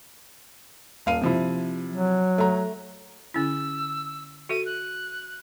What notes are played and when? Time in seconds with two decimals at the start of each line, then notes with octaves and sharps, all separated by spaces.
1.06 D#1 F5 D#7
1.21 C3 F3 E4
1.90 F#3
2.38 A3 A#5
3.34 D3 C#4 E4 E6
4.49 F#4 A4 E5 D#7
4.65 F#6